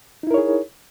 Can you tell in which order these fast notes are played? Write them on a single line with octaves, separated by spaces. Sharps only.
D#4 E4 A#4 C#5 G#4